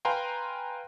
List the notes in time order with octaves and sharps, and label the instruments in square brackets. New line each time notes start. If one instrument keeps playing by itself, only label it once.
[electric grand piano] B4 F5 G5 G#5 A#5 C6